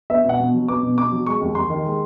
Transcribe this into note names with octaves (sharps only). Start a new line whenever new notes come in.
B3 E5
B2 F#5
B2
F#3
B3 D6
B2
B2 D6
F#3
G#3 C#6
D#2
D#2 C6
D#3
G#3